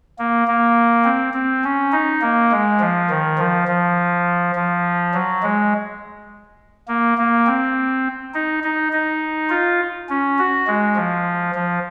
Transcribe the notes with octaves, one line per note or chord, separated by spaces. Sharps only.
A#3
A#3
C4
C4
C#4
D#4
A#3
G#3
F3
D#3
F3
F3
F3
F#3
G#3
A#3
A#3
C4
D#4
D#4
D#4
F4
C#4
F#4
G#3
F3
F3